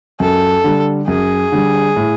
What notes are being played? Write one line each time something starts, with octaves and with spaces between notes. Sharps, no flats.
F#2 A4
D3 G3
F#2 G#4
D3 G3
A2